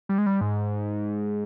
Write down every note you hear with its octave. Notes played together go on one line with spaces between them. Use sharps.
G3
G#3
G3
G#2